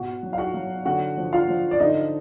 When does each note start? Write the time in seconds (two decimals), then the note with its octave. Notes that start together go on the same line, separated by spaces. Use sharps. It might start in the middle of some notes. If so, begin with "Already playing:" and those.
Already playing: B2 F#4 F#5
0.23 F#3
0.33 F5
0.38 F#4 F#5
0.54 F#3
0.85 D3 F#4 F#5
1.17 F3
1.33 F4 F5
1.49 F3
1.71 D5
1.80 D3 D#4 D#5